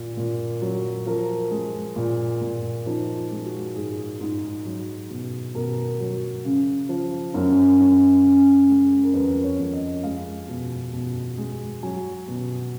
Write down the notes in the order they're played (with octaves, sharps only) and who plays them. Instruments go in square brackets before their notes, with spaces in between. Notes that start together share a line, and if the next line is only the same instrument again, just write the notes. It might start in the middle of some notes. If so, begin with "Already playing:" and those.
Already playing: [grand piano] A#2
A#2
F#3
F3 A#4
G#3
A#2
A#2
F3 D#4
F4
G#3
F#4
G#2 G#4
G#2
F#3
B2
B2 A#4
F#3
C#3
F3
F#2
F#2
C#3
G#3
A#4
F2 B4
C#5
F2
D#5
G#3 F5
B2
B2
G#3
F#3 G#5
B2